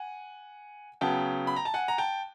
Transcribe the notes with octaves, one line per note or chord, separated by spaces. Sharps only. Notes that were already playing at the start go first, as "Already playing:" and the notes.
Already playing: F#5 G#5
C#3 F#3 B3 G5 A5
B5
A#5
A5
F#5 G#5
A#5
G5 A5